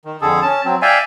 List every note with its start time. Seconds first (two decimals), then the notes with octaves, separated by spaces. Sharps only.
0.05 D#3
0.21 F2 D3 G#4 A4
0.42 C#4 A5
0.65 F#3 C4
0.82 D5 E5 F5 G5 G#5